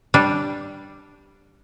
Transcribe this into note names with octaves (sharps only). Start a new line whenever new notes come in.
G3 D4